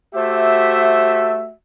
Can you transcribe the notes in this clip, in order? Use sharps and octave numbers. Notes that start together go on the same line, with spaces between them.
A3 F#4 G4 C5 E5